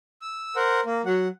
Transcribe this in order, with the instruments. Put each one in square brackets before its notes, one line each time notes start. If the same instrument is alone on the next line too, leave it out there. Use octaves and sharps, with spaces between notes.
[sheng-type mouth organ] E6
A#4 C5 F#5
A#3
[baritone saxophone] F#3 [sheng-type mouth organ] F#5